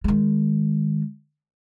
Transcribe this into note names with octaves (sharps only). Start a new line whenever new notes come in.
D#3 G#3